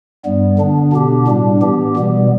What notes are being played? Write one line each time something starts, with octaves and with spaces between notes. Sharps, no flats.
G2 G3 B3
D3 B3 D4
B2 B3 D4 G4
A2 G3 D4
E3 B3 G4
B2 G3 B3